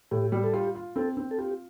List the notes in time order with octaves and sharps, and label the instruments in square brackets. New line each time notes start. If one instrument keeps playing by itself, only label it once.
[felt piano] A2 [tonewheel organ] G4
[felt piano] G3
[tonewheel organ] A4
[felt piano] F4 [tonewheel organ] G4
[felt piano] F4
[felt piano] C4 [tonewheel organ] A4
[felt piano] C4
[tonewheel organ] A4
[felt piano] F4 [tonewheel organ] G4